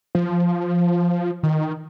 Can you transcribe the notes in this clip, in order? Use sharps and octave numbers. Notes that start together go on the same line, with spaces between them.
F3
D#3